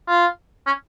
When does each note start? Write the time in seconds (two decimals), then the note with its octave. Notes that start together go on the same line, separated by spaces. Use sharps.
0.08 F4
0.66 C#4